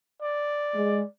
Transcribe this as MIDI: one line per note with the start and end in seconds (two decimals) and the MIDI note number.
0.21 1.06 74
0.75 1.02 56